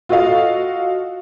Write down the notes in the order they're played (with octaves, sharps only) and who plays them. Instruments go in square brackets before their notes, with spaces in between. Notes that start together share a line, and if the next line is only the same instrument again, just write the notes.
[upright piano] F4 F#4 A4 D#5 F5